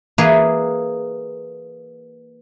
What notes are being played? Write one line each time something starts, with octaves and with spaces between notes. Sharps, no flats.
E3 A#3 G#4 B4